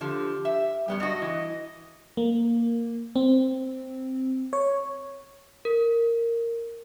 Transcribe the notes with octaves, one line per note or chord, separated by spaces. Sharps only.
D3 F3 G4
E5
F#2 G3 B3 G4
G2 F#4 D#5
E3
A#3
C4
C#5
A#4